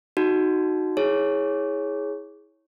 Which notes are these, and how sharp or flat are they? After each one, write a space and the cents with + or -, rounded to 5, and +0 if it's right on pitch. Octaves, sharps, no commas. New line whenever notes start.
D#4 +0 F#4 +0
E4 -25 G#4 +5 C#5 -5